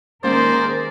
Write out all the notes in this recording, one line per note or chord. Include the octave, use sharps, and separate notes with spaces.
D#3 G#3 A#3 C#4 G#4 A#4 C5 D5